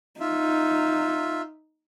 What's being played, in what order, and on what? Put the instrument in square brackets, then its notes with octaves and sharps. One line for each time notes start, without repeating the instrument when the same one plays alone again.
[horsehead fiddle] D#4 [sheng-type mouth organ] F4 E5